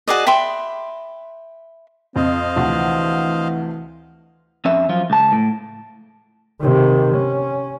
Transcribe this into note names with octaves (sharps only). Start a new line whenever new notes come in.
F#4 G#4 D5 D#5
E5 G5 B5 C6
F2 C4 C5 D#5 F5
D2 C3 E3 F3
F2 C#4 E5
F#2 F3 F4
C#2 A5
A2
C3 D#3
C#4